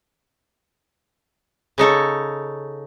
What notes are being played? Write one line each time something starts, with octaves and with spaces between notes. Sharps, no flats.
C#3 D#4 A4 C#5